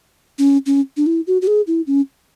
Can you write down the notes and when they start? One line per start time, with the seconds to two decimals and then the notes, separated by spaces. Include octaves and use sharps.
0.39 C#4
0.66 C#4
0.97 D4
1.06 E4
1.27 F#4
1.42 F#4
1.47 G#4
1.67 E4
1.87 C#4